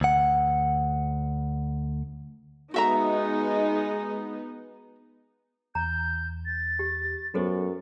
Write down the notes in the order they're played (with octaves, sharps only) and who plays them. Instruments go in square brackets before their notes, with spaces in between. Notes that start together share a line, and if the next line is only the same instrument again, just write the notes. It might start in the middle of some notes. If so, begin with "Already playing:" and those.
[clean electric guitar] D2 F#5
[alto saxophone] G#3 [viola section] B3 D#4 [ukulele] F#4 E5 A#5
[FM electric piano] E2 [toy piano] A#5 [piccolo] G6
[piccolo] A6
[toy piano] G4
[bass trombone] F#2 [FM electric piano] F#3 B3 C#6 [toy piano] F#4 A4 C5